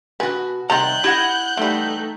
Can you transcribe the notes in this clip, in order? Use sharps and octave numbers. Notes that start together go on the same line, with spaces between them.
B2 F#4 B4 G#5
C3 D#3 G3 A#5 F#6 G6
E4 G4 D#5 F#5
E3 G3 A3 D#4